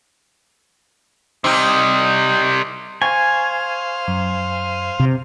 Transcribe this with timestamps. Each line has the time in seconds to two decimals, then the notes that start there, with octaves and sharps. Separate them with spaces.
1.44 C3 G3 C4 D#4
3.02 C5 F5 G#5 C#6 G#6
4.08 F#2
5.00 C3